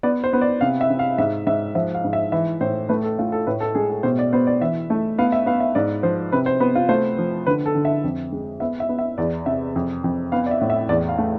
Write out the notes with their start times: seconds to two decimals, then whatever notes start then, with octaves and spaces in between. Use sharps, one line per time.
0.03 B3 D5
0.24 C5
0.33 B3
0.41 D5
0.61 C3 F5
0.81 E5
0.90 C3
0.99 F5
1.18 G#2 E5
1.47 G#2 E5
1.75 F3 E5
1.95 F5
2.04 G#2
2.13 E5
2.32 E3 E5
2.61 A2 C5
2.89 A3 B4
3.03 A4
3.19 A3 F4
3.32 A4
3.47 A2 B4
3.60 A4
3.75 G#3 G#4
3.90 A4
4.03 B2 C5
4.19 D5
4.33 B3 C5
4.47 D5
4.61 E3 E5
4.90 A3
5.18 B3 F5
5.32 E5
5.46 B3 F5
5.60 E5
5.75 G#2 D5
6.03 F3 C5
6.32 C3 B4
6.46 C5
6.60 B3 B4
6.75 F4
6.89 A3 C5
7.18 F3
7.46 D3 B4
7.66 A4
7.75 D3
7.85 E5
8.04 F2
8.32 G#3
8.60 B3 E5
8.80 E5
8.89 B3
8.99 E5
9.18 E2 D5
9.46 C3 E5
9.76 F2
10.04 F2
10.32 B3 F5
10.46 D5
10.51 E5
10.61 A2
10.70 E5
10.89 E2 D5
11.09 F5
11.18 A3